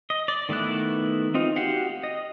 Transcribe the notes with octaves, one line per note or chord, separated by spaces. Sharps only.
D#5
D5
D#3 A3 B3 E4 F#6
C4 D#4 F4
F#4 G4 F5 F#5
D#5